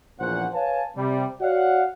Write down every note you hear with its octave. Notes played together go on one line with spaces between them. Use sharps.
A#1 E2 A#2 C#4 C5 F#5
B4 C#5 F5 G#5 A5
C3 G3
F#4 C#5 D5 F5 F#5